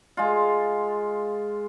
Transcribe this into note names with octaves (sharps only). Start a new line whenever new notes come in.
G#3 F4